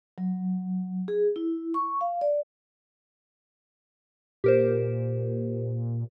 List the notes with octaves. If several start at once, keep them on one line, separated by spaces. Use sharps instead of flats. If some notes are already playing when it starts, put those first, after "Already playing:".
F#3
G#4
E4
C#6
F5
D5
A#2 G4 A#4 C5